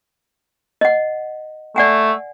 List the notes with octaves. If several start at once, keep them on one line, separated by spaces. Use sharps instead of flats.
D#5 F#5
A3 D5 F#5 G#5